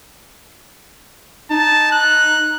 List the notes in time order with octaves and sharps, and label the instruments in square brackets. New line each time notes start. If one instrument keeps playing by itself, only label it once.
[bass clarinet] D#4 [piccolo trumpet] A5
[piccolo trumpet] F#6